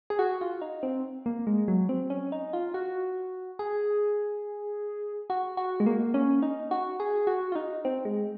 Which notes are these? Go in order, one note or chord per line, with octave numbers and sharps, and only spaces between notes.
G#4
F#4
F4
D#4
C4
A#3
G#3
F#3
C4
C#4
D#4
F4
F#4
G#4
F#4
F#4
G#3
A#3
C#4
D#4
F#4
G#4
F#4
F4
D#4
C4
G#3